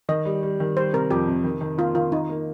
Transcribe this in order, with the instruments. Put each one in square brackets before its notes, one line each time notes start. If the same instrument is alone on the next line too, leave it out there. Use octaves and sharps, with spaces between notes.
[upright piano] D#3 [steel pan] D#5
[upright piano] G3
G3
D#3
[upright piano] G3 [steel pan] C5
[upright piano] C3 [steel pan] A#4
[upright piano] F2 [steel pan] G4
[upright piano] C3
D#3
D#3
[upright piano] A#3 [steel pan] F4
[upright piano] D#3 [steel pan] F4
[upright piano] D#3 [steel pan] D#4
[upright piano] A#3